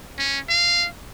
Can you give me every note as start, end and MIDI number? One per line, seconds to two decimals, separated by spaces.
0.18 0.39 61
0.49 0.87 77